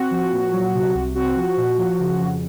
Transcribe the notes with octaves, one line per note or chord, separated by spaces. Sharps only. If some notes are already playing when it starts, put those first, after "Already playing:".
Already playing: C4 F#4
F3
A#2
F#3
C3
C2
C4 F#4
F3
A#2
F3
C#3
F2